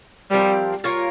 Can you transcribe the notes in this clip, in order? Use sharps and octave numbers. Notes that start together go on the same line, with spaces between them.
F3 G3 C4 G4 A#4
A#3 F4 A#4 C#5